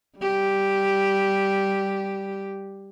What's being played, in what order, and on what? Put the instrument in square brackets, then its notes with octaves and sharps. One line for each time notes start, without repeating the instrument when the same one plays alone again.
[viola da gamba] G3 G4